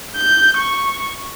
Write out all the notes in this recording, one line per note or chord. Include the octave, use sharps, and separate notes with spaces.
G6
C#6